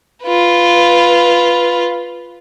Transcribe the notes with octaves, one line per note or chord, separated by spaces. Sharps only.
F4 B4